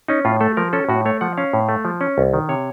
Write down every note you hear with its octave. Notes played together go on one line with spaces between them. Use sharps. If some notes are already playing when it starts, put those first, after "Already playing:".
C#4 D#4
A2 F4
A3 A4
F3 A#4
C#4 A4
A2 F#4
A3 C#5
F3 F#5
C#4 F5
A2
A3
F3
C#4
C2
D#3
C3 C#5